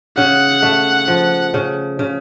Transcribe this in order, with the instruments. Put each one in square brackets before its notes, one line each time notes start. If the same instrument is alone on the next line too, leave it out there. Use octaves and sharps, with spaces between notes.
[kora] C#3 [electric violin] F#5
[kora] A3
F3
C#3
C#3